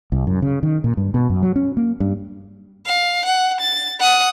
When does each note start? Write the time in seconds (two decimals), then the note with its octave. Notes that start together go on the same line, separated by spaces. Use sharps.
0.12 C2
0.27 F#2
0.42 C#3
0.63 D#3
0.84 A#2
0.97 G2
1.14 B2
1.30 F#2
1.42 F#3
1.56 C#4
1.77 A#3
2.00 G2
2.86 F5
3.25 F#5
3.60 A6
4.00 F#5 D#6